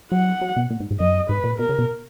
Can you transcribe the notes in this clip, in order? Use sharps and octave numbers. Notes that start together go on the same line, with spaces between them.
F#3 F#5
F#3
B2
A#2
G#2
G#2
F#2 D#5
G#2 B4
A#2
B2 A#4
C#3
B2